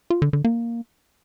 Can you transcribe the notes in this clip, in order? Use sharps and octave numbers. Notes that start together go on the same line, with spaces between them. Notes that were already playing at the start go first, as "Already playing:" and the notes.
F4
D3
D3
A#3